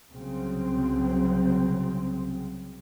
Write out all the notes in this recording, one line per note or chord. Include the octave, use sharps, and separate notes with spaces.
C2 C#3 F#3 C4